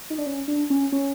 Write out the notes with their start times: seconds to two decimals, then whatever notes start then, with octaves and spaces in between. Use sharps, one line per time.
0.10 D#4
0.18 D4
0.26 C#4
0.48 D4
0.70 C#4
0.92 C#4